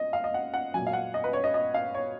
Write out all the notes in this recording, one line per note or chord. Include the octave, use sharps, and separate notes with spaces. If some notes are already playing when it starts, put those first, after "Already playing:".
Already playing: D#5
F5
D#5
F#5
F#5
A#2 F#3 G#5
F5
F#5
D#5
B4
C#5
D#5
D#5
F5
C#5